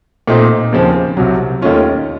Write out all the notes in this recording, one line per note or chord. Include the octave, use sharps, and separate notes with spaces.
A#2 A3 C4 D#4
D#2 C#3 F3 C4
C2 C3 F#3
D#2 D#3 A3 C#4 F4